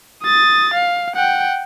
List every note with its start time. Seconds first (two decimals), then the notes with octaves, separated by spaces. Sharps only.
0.23 D#6 A6
0.73 F5
1.15 F#5 G5